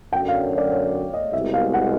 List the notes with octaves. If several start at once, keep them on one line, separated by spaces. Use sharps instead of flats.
F#2 D3 F#3 G5
F5
D5
C#5
D#5
C2 B2 G#3 E5
F5
F#5